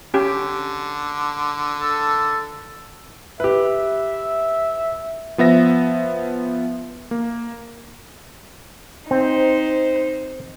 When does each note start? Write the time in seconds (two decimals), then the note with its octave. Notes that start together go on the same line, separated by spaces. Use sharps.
0.14 D3 C#4 G4
1.80 A4
3.40 G4 B4 E5
5.38 F3 B3 E5 A#6
7.11 A#3
9.11 C4 D#4 C5